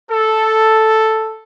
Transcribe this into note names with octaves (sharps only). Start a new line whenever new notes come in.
A4